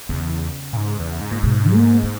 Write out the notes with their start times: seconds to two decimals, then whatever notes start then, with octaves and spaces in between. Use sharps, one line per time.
0.09 E2 C#3
0.73 A#2
0.77 G#2
0.99 E2
1.21 G#2
1.31 A#2
1.43 B2
1.73 A#3
2.03 G#3